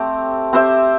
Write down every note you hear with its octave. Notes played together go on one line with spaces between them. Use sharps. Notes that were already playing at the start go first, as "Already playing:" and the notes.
Already playing: A3 C4 G4
C4 G4 C5 E5